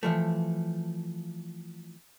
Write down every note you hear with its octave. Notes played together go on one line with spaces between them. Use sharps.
E3 F3 A3